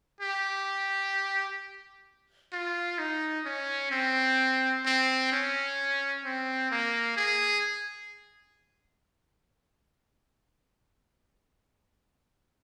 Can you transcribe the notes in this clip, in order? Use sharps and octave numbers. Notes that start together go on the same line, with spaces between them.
G4
F4
D#4
C#4
C4
C4
C#4
C4
A#3
G#4